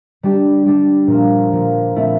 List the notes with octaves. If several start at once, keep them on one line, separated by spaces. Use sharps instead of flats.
G3 D4 G4
G3 D4 G4
A#2 F3 A#3
A#2 F3 A#3
A#2 A3 C4 E4